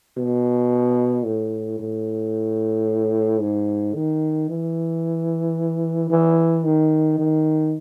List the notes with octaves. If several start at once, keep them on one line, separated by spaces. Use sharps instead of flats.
B2
A2
A2
G#2
D#3
E3
E3
D#3
D#3